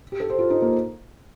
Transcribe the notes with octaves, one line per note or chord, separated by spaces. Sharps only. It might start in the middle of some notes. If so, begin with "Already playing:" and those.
G4
A4
C5
F4
D#4
A#3